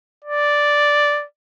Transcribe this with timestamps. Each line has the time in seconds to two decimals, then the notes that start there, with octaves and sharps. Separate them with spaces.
0.24 D5